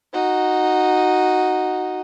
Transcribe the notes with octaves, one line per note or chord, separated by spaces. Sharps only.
D#4 F#4